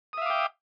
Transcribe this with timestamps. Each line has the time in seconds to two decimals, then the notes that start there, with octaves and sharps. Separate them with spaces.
0.13 D#6
0.17 E5
0.22 F5
0.26 D6
0.30 G5